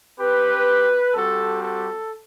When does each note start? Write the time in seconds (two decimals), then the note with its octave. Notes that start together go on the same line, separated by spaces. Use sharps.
0.19 C4 G4 B4
1.14 G3 C4 F#4 A4
1.61 A4